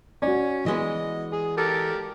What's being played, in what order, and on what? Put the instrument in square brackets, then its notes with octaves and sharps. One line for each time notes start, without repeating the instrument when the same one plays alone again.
[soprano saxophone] C#4 [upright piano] F#4 D5
[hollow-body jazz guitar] E3 G#3 B3 [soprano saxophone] D#5
[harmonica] G#4
[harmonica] G4 A#4 [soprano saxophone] A4